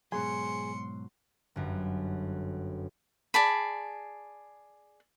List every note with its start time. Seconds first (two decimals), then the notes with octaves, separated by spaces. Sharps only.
0.12 G#2 B2 F#3 G#4 G#5 C6 C#7
1.56 G1 F#2
3.34 G#4 D5 A5 B5